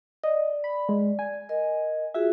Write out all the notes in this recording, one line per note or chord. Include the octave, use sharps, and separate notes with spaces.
D5 D#5
B5
G#3
G#5
A#4 D#5
F4 F#4 G#4 E5